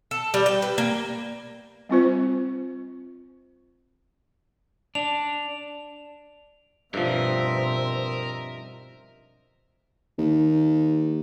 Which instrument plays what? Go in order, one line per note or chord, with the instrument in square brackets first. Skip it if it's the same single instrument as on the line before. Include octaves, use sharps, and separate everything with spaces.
[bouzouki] A4
G3
G5
B4
A#3
[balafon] G3 C4 F4 C5
[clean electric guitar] D4 [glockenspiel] F7
[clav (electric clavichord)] G2 F3 [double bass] B2 C4 [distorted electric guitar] A#4 [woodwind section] D#5 E5
[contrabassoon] D#2